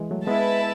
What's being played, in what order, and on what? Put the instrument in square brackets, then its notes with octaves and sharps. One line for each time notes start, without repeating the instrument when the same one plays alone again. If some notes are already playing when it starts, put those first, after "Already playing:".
Already playing: [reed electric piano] E3 G#3
F#3 A3
[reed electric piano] G#3 B3 [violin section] E4 B4 E5 A5